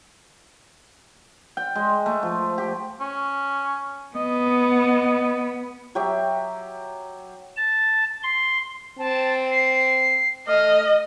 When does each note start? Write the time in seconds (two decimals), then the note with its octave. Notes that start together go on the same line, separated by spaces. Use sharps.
1.57 G5
1.75 G#3
2.06 A3
2.23 F3
2.58 G4
3.00 C#4
4.16 B3 D#5
5.95 F#3 G4 E5
7.57 A5
8.23 C6
8.99 C4 A5
9.51 C7
10.48 A3 D#5 F6